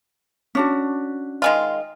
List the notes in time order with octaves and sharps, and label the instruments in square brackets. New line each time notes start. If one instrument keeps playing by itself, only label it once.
[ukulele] C#4 D4 F#4
[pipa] D#3 G#3 F4